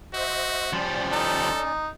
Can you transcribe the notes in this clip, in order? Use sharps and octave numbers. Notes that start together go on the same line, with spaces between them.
F#4 C5 D#5 E5
F3 G3 C#4 D5
D#4 A4